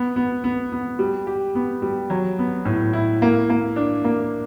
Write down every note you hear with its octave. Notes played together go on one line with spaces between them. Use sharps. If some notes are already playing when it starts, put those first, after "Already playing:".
Already playing: B3
B3
B3
B3
G3
G4
B3
G3
F#3
B3
A2
E4
A#3
A#3
D4
A#3